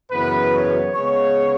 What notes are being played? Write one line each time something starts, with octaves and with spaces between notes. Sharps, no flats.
F#2 C#3 E3 B3 B4
C#5
C#3 G#3 B3 C#5